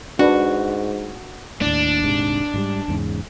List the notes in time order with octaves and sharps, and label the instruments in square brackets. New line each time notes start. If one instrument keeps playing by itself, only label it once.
[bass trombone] G#2 [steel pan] D4 B4 [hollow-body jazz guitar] F#4
[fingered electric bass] D#2 A2 [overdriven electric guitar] D4
[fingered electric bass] D#1 G#2 C3
G#2 F3 G3
E2 G#2 C#3